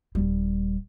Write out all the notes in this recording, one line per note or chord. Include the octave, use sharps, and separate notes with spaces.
D#1 G3